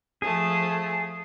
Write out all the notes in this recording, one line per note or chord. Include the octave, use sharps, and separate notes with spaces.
F3 A3 G#4